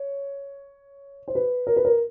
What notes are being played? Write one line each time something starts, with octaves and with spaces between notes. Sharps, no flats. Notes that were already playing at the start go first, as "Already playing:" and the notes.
Already playing: C#5
C5
B4
A#4
B4
A#4